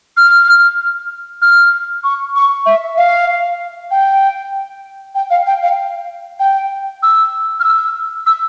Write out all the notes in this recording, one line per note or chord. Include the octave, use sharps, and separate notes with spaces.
F6
F6
C#6
C#6
E5
F5
G5
G5
F5
G5
F5
G5
E6
F6
E6
E6